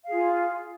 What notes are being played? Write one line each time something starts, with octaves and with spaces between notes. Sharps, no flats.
F4 G#4 F5